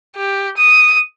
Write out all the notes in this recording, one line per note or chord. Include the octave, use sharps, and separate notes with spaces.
G4
D#6